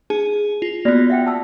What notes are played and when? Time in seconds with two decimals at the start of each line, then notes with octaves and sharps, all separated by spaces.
0.10 D#4 G#4
0.62 F4
0.85 A#3 B3 F4 F#4 D5
1.10 E5 F#5 G5
1.26 A5 E6